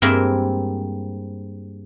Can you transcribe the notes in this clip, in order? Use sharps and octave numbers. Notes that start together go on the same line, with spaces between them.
G2 G#3 A#3 C4 A#4 E5